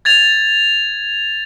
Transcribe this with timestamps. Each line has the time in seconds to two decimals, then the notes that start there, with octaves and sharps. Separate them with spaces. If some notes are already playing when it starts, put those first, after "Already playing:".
0.05 G#6 A6 F7